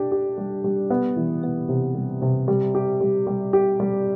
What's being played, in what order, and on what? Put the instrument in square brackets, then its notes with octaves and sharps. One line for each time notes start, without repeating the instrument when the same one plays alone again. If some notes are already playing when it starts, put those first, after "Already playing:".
Already playing: [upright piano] D4 G4
G4
G3
G3
B3
E3
B3
C3
G3
C3
G3
G4
G3
G3
G4
G3